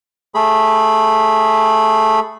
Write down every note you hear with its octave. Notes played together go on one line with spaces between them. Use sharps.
A3 G#4 B5